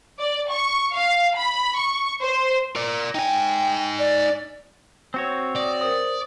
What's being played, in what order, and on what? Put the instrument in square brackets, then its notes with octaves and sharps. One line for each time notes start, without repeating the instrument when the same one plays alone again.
[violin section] D5
C#6
F5
B5
C#6
C5
[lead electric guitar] A#4 D5
[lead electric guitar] D#4 G#5 [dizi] G5
[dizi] D5
[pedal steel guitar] C4 F#4 C#5
[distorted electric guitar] D5 [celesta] D#6 A#6
[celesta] A#4 C5 [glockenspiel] D#6